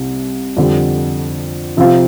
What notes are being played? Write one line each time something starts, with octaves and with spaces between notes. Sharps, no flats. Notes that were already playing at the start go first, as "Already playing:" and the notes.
Already playing: C2 C3
F2 D3 G3
C3 F3 C4 F4